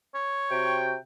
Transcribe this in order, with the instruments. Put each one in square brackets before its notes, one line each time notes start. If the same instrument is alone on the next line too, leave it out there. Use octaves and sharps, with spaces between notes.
[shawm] C#5
[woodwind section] C3 F#4 G5